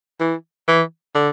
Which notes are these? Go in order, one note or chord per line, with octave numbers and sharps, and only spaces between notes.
E3
E3
D3